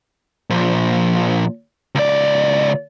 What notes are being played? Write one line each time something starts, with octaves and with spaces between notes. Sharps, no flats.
A#2 F3
C#2 D5